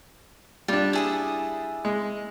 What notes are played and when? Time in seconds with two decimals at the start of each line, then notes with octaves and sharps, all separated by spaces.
0.68 G3 D4 F4
0.93 E4 G#4 D#6
1.85 G#3